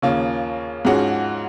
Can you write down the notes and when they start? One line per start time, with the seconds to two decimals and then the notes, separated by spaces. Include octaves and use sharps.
0.02 D#2 C#3 F3 A#3 C#4
0.85 G#2 F3 G#3 C#4 F#4